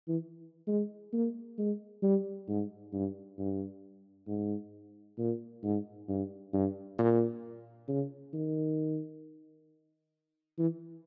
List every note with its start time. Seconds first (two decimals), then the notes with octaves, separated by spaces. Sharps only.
0.08 E3
0.68 G#3
1.13 A#3
1.58 G#3
2.03 G3
2.48 G#2
2.93 G2
3.38 G2
4.28 G#2
5.18 A#2
5.63 G#2
6.08 G2
6.53 G2
6.98 A#2
7.88 C#3
8.34 D#3
10.58 E3